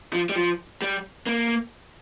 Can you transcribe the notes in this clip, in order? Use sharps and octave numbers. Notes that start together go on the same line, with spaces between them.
F3
G3
F3
G3
A#3